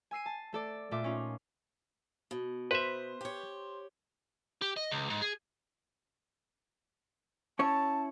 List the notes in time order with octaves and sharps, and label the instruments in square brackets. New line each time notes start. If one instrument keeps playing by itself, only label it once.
[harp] G#5 E6 C7 D#7
A5
A3 A4 D5
A#2 A3 F4 E5 D6
C#4 D#4 F4
[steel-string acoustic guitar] B2
[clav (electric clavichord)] B4 E5 [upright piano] C5
[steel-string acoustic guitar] G4 C#5
[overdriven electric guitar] G4
D#5
C#2
G#2
G#4
[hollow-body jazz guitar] C#4 E4 C#5 [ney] A5